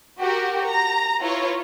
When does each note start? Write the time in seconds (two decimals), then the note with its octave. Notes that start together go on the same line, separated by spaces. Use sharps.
0.19 F#4 G4 A#4
0.65 A#5
1.20 E4 F4 B4 C#5